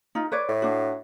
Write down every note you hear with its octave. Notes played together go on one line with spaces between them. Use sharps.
D#4 F4
B4 C#5 D5
A2
D4 F#4